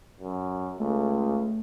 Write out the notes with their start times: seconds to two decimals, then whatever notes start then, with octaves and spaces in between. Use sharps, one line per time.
0.20 F#2
0.80 C#2 A3